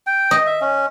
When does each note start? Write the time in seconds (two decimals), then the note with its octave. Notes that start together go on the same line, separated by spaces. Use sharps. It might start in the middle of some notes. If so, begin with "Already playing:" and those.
0.07 G5
0.31 D#5
0.47 E5
0.61 C#4